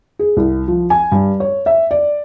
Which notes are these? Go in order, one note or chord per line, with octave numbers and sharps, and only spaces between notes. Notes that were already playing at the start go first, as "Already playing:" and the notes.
G#4
C2
F3
G#5
G2
C#5
E5
D5